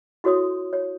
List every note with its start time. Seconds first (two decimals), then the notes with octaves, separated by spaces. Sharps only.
0.24 E4 F#4 A4 C#5 C6 D#6
0.73 C#5